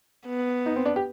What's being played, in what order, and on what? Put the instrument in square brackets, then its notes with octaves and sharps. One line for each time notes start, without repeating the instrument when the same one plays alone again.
[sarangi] B3
[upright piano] D#4
C4
D4
G4